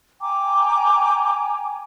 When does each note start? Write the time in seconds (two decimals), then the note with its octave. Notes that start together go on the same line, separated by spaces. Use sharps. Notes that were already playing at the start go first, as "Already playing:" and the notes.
0.21 G5 G#5 A#5 D6